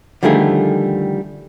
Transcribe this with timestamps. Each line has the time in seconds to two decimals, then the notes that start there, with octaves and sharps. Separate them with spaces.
0.23 D3 D#3 F3 G3 A3 G#4